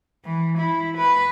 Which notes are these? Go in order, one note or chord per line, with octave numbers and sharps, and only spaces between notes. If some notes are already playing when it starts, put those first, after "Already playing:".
E3
E4
B4